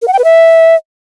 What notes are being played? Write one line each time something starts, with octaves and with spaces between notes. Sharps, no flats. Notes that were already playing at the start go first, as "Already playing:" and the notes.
A#4
F#5
G5
B4
E5